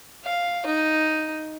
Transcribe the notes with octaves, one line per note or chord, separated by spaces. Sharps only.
F5
D#4